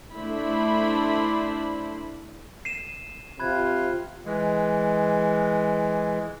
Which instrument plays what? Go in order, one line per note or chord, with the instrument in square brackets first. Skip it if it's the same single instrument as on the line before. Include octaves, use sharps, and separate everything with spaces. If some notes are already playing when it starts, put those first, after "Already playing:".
[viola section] A3 D4 E4 C5 B5
[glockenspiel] C7 D#7 E7
[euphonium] C3 [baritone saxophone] F4 [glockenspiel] B5 F#6 G#6
[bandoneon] E3 G#3